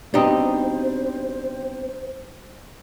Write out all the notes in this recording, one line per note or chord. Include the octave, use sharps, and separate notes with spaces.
B2 G3 C4 D4 D#4 G4 C5 D#5